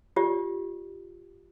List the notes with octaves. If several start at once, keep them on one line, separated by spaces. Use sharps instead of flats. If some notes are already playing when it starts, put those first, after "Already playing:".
F4 G4 D5